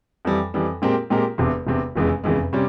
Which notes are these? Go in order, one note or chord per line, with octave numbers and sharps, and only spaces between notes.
F2 E3 G3
F2 E3 G3
A#2 G#3 C4 G4 A#4
A#2 G#3 C4 G4 A#4
E1 E2 C3
E1 E2 C3
F1 E2 C#3 E3 G#3
F1 E2 C#3 E3 G#3
C3 G3 C#4